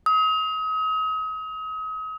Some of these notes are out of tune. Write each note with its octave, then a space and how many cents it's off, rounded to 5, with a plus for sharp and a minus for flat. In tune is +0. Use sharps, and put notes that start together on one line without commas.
D#6 +35